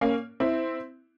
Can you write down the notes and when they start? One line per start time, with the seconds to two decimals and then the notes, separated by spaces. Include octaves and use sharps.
0.01 A#3 C#4
0.40 C4 E4